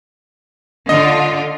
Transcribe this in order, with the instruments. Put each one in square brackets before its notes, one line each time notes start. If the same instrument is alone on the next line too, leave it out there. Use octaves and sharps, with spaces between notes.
[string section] D3 F4 [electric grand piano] D#5